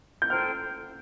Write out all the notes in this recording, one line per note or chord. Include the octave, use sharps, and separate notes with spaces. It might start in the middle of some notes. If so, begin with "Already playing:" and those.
G6
A4 C5 G5 A#5 F6